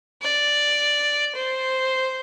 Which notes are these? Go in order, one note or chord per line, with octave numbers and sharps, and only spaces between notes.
D5
C5